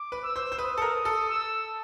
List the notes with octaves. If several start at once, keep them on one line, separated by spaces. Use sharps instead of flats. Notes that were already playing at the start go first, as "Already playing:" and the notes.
Already playing: D6
B4
E6
C5
C5
B4 D#6
A4
A#4
A4
E6